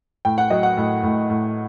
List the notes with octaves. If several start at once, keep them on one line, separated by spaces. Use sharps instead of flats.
A2 G5
F#5
F#3 D#5
F#5
A2
A2
A2